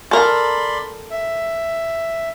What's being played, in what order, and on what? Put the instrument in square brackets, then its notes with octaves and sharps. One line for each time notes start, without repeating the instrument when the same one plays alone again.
[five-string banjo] A4 A#4 [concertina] D5 B5 C6
[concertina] E5